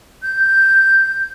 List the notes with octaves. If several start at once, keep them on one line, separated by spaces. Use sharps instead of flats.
G6